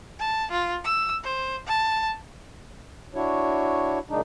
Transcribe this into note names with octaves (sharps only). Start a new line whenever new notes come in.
A5
F4
E6
C5
A5
D4 E4 F#4 C#5
F#2 A#2 C#3 G#3 D4 D#4